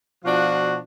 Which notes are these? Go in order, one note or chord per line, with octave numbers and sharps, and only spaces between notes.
B2 F3 D4 F4 F#4